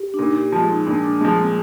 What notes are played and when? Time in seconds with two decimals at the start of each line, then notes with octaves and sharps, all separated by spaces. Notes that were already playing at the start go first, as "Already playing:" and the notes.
Already playing: G4
0.14 D4
0.18 A#2 D#4
0.36 G4
0.52 F3 F4
0.58 G#3
0.69 D#4
0.87 A#2 D4
1.04 D4
1.21 F3 G#3 C4
1.38 A#3